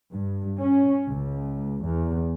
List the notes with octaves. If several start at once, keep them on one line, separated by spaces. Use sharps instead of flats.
G2
C#4
C#2
E2